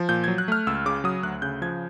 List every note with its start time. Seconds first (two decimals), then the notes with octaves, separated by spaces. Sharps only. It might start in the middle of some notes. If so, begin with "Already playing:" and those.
Already playing: F3
0.09 A#2 G6
0.24 F#3 G#6
0.38 F#6
0.48 A3 F6
0.67 C#2 E6
0.86 C#3 D6
1.04 F#3 D#6
1.23 D2 F#6
1.42 C#3 G6
1.62 F3 G#6